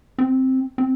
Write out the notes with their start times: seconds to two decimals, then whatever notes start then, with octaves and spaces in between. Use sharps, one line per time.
0.18 C4
0.78 C4